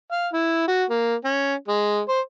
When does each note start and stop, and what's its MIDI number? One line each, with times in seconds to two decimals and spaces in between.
0.12 0.27 77
0.33 0.67 64
0.68 0.84 66
0.90 1.15 58
1.24 1.54 61
1.68 2.01 56
2.09 2.20 72